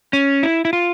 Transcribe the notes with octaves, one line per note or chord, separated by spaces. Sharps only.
C#4
E4
E4
F4